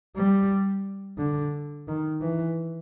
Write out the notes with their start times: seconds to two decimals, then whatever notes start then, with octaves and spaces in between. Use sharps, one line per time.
0.16 G3
1.18 D3
1.88 D#3
2.21 E3